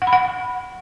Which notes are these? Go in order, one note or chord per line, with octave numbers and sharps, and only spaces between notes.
F#5
B5
F#5